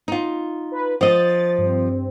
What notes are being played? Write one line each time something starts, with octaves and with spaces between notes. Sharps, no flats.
D#4 F4
B4
F3 D#5 A6
G2 C4